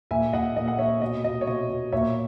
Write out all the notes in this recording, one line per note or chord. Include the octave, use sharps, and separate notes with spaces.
A#2 E5 G#5
A#2 D#5 F#5
A#2 D#5
F#5
A#2 C#5 E5
B2 D#5
B2 D#5
C#5
B2 D#5
B2
A#2 C#5 E5